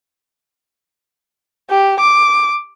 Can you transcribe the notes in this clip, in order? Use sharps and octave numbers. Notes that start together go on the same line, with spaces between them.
G4
D6